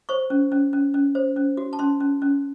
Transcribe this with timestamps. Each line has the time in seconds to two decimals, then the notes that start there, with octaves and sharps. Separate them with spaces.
0.09 C5 C#6
0.30 C#4
0.52 C#4
0.73 C#4
0.94 C#4
1.15 C5
1.36 C#4
1.57 F#4
1.73 A5
1.79 C#4 C6
2.00 C#4
2.22 C#4